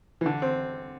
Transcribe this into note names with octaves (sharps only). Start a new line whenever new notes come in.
E3
D3
C4